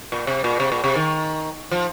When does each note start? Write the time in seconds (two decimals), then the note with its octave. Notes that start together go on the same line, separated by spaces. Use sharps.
0.12 A#2
0.27 C3
0.44 A#2
0.60 C3
0.72 A#2
0.84 C3
0.95 D#3
1.71 F3